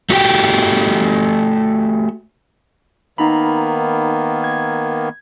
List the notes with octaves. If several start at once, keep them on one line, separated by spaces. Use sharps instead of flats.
A3 F#4 G4 G5
D#3 A#3 B3 D#4 A#5 B5
G#6